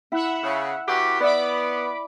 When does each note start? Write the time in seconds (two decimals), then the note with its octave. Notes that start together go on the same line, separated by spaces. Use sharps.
0.12 E4 E5 F#5
0.43 C#3
0.88 E2 F#4 G4
1.20 B3 D5 E5 B5 D6